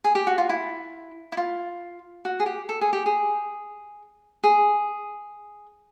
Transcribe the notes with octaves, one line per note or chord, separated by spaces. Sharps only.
G#4
G4
F#4
F4
E4
E4
F4
F#4
G#4
G4
A4
G#4
G4
G#4
G#4